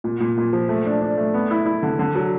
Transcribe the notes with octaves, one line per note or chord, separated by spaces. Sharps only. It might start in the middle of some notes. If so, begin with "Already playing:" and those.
A#2
A#2
A#2
F3
A3
D4
D4
A3
B3
E4
E4
D3
D3
F#3